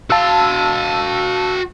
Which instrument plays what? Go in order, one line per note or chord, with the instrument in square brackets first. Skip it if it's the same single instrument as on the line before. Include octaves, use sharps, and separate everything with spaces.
[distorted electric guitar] F#4 F5 [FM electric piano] A5 E6